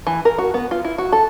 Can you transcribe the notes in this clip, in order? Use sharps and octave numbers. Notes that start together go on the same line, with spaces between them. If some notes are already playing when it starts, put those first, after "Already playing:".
E3
A#4
F#4
B3
F4
E4
F#4
A4